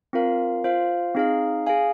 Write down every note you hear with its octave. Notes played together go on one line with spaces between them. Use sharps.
C4 F4 A#4 F5
F4 C5 F5
C4 D#4 G#4 F5
G#4 F5 G#5